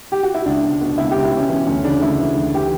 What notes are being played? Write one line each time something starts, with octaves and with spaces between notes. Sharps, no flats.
G4
F#4
E4
C#2 D4
B2
B2
C#2 E4
C#2 G4
E4
B2 C#4
E3 C#4
D2 C#4
C#3 D4
D2 E4
E3
D2
E3 G4